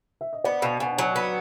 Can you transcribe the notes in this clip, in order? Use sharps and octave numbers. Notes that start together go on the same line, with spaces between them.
E5
D#5
B3 C5 D5
B2 F5 G5
B2 F#5 G#5
F#3 F#5 G#5
B3